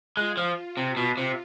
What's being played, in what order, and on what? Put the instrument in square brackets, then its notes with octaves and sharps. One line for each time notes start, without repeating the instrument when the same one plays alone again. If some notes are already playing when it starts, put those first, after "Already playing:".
[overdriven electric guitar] G#3 [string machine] F4
[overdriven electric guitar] F3
C3
B2
C3